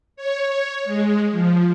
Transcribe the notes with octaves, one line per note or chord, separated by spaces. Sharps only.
C#5
G#3
F3